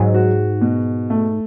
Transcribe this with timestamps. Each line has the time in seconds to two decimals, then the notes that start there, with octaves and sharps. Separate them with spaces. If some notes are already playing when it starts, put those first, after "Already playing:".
Already playing: G#2 F#3
0.14 F#4
0.61 B2
1.10 A3